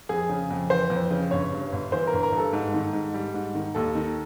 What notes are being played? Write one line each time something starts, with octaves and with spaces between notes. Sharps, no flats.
F2 G#4
C#3
F2
E3 C5
F2
C#3
G1 C#5
G2
G1
E3 C5
A#4
G1
A#4
G2 A4
G#2
D#3
G#2
G3
G#2
D#3
D#2 A4
D#3